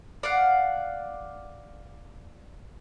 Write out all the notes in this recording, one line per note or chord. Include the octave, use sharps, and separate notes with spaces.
D5 F5 F#5